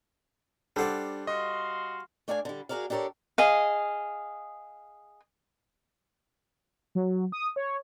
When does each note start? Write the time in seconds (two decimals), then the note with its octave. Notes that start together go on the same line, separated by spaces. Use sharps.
0.76 G3 D4 A4 C5 D5 F#5
1.27 F#4 D#5 F5 C6
2.28 A3 D4 D5 F5 F#5 G#5
2.45 D3 G3
2.69 F#4 G#4 A#4 D5 F5
2.90 D4 G4 A4 A#4 C#5 D5
3.38 G#4 D#5 F5
6.95 F#3
7.32 D#6
7.56 C#5